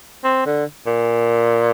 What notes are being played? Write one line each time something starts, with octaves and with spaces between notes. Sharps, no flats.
C4
D3
A#2